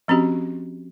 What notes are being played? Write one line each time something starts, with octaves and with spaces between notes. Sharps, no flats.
F3 C4 C#4 F#4 G4